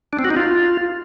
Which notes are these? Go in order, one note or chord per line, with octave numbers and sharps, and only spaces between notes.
D4
C4
F#4
D#4
F4